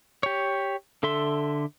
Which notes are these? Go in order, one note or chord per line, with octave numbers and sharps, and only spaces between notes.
G4 C#5
D3 A4 E5 C6